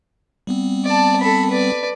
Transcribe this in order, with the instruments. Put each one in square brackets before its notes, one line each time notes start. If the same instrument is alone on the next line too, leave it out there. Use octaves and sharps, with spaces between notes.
[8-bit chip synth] G3 B3 C4
[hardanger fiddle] D5 A5
A4 B5
B4 D5